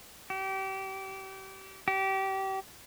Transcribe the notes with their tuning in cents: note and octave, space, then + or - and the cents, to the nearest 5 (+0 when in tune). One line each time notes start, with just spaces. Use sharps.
G4 -30
G4 -25